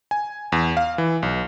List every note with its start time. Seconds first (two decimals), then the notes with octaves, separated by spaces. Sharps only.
0.11 G#5
0.52 E2
0.77 F5
0.98 E3
1.22 B1